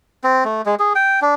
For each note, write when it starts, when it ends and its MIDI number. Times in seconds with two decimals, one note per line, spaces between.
0.24 0.44 60
0.45 0.62 57
0.66 0.75 56
0.79 0.93 68
0.95 1.20 79
1.22 1.35 62